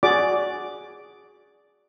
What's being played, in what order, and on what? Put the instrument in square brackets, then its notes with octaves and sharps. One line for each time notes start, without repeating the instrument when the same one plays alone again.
[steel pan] F#4 G#4 D5 D6